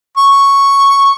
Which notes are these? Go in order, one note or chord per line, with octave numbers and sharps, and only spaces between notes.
C#6